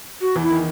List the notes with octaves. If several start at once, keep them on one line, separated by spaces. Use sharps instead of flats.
F#4
E2 E3
E4
D#3